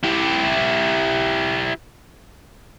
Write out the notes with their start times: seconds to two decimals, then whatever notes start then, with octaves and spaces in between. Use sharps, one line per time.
0.04 E4 G4